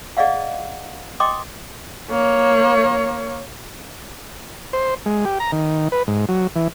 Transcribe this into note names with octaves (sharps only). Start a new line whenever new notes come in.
G#4 D5 D#5 F5 F#5
D#5 G5 C6 D6 D#6
A#3 C#5
C5
G#3
G4
A#5
D#3
B4
G#2
F#3
E3